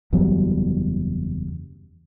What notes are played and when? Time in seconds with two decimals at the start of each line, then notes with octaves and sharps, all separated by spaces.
0.13 F#1 E2 F#3 G3